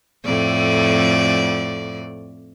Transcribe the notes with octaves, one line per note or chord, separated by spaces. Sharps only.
F2 A2 D5